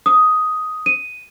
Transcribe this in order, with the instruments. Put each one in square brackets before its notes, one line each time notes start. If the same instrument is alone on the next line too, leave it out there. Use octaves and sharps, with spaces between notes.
[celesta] D#6
D#7